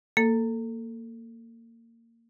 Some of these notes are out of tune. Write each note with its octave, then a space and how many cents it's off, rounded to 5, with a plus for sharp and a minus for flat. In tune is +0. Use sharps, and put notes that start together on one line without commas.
A#3 -20 A4 +10